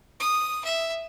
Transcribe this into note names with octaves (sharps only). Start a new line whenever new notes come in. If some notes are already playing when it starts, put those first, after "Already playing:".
D#6
E5